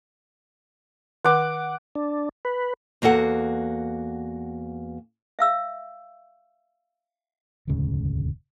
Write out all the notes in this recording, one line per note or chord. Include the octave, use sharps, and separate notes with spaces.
D#3 F#5 D6
D4
B4
E2 A#3 F#4 A4 F#5
E5 F5 E6
E1 D2 G#2 C#3